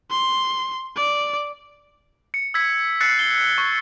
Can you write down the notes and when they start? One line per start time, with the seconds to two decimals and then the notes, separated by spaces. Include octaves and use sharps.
0.11 C6
0.96 D5
2.34 C#7
2.54 E6 G#6 B6
3.01 E6 F#6 A6 C7 C#7
3.19 G7
3.58 C#6